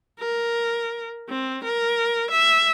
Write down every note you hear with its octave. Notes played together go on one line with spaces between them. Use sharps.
A#4
C4
A#4
E5